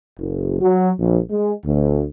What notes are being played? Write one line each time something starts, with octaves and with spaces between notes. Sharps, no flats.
F#1
F#3
A#1
G#3
D2